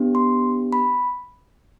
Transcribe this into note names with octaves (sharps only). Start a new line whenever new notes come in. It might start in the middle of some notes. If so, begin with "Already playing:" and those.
Already playing: B3 D4 G4
C6
B5